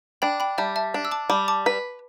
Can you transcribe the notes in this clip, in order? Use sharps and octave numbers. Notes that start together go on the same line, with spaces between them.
D4 G5 B5
G5 B5
G3 E5 A5
E5 A5
D4
E6
A5 D6
G3 A5 D6
A5 D6
B4